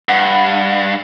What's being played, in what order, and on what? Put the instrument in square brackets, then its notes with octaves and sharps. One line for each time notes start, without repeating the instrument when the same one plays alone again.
[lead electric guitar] G2 [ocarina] F#5